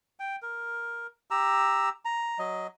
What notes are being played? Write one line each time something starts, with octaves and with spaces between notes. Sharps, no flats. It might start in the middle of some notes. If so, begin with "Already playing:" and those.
G5
A#4
G4 A#5 E6
A#5
F#3 D#5